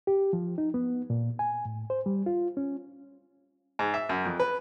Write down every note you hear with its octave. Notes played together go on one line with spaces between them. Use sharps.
G4
F3
D#4
B3
A#2
G#5
A2
C5
G3
F4
C#4
G#2
E5
F#2
F2
B4